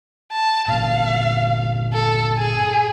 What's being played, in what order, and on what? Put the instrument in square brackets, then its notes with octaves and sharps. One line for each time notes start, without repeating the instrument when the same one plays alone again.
[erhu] A5
[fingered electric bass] G1 A#2 [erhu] F5
[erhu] A4
G#4